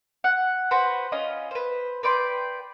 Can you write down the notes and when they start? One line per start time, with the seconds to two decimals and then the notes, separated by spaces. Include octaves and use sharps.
0.24 F#5
0.71 F#4 B4 C5 B5
1.12 C#4 F4 D#5
1.51 B4 C5
2.03 B4 D5 G5 C6